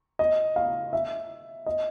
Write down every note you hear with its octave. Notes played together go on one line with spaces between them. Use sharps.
D#5
F5
E5
D#5